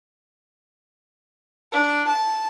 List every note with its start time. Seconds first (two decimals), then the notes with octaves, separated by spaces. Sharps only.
1.72 D4
2.08 A5